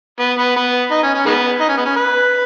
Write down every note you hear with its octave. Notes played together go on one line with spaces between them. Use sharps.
B3
B3
B3
D#4
C#4
C#4
D#3 G#3 B3
D#4
C#4
B3
C#4
B4